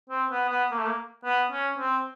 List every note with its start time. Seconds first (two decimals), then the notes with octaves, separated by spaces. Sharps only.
0.09 C4
0.31 B3
0.50 B3
0.71 A#3
0.79 A3
0.87 A#3
1.24 B3
1.51 C#4
1.78 C4